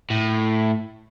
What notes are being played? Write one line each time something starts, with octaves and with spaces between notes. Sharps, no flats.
A2